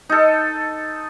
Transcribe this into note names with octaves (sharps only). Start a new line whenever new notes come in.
D#4 A4